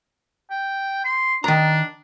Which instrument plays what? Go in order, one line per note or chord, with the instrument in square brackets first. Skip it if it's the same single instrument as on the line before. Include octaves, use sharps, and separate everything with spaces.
[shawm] G5
C6
[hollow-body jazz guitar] D#3 A#5 [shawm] D4